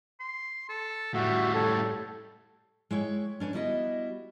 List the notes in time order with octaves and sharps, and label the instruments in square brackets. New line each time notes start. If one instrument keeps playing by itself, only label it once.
[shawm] C6
A4
[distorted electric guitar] A2 G3 [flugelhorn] F#4 [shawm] E5
[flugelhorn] A4 [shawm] C#5
[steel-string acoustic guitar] G#3 E4 C#5 G5
C#4 D4 B4 C#5
G3 B3 E4 F#4 D#5